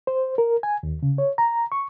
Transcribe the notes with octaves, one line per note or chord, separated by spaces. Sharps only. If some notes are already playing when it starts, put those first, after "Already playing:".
C5
A#4
G#5
D#2
C#3
C#5
A#5
C#6